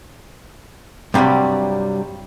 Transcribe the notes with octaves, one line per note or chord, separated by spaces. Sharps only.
G2 C3 D#3 F#3 G3